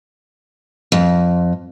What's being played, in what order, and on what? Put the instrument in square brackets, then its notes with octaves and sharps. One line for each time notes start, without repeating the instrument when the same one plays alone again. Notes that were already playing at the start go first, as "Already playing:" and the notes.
[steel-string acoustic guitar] F2